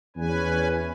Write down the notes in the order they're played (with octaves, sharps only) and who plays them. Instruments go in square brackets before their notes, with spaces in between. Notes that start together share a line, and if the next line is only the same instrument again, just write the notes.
[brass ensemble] E2 [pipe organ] C#4 B4 G#5